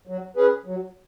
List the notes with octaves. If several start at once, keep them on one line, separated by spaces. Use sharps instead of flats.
F#3
C#4 G#4 B4
F#3